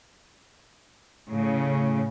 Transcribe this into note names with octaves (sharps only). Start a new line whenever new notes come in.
A2 C#3